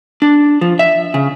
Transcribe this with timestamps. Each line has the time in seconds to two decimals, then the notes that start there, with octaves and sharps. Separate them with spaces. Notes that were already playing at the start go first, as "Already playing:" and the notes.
0.22 D4
0.61 F3
0.79 E5
1.14 C#3